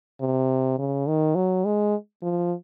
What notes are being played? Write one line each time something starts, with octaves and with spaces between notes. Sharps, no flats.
C3
C#3
D#3
F#3
G#3
F3